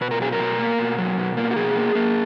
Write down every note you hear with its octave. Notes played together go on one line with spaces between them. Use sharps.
B2 B4
A#4
F#3 G#4
A#4
B2
A#3
B2
F#3
B2
A#3
F#4
B2 G#4
A#3
A#3